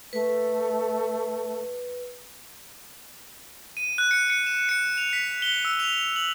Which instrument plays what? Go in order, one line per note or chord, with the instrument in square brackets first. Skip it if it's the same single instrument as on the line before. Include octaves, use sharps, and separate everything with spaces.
[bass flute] A3 [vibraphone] B4
[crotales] D#7
F#6
C#7
C#7
E7
C#7
F7
B6
G7
E6
F7
F#7